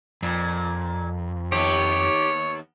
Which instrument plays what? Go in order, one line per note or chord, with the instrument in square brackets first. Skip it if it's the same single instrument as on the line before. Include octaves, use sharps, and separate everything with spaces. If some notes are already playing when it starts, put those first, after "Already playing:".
[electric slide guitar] F2 [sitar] A#2
[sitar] D#2 B3 [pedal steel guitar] G4 [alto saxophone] C#5